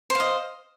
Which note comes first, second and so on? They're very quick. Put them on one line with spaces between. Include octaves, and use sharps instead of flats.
C5 F5 D#5